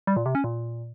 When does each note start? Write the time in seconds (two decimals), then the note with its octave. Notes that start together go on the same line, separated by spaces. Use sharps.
0.07 G3
0.17 A#2
0.26 C3
0.35 C#4
0.44 A#2